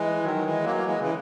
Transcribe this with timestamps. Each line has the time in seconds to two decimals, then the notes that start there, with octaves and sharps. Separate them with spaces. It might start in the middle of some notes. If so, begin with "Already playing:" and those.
Already playing: E3 G#3
0.23 D#3 F#3
0.35 F#3
0.43 E3 G#3
0.64 F#3 A#3
0.75 A#3
0.84 E3 G#3
0.99 C#3 E3